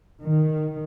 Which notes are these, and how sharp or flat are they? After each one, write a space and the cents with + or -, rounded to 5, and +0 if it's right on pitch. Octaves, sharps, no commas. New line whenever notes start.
D#3 -5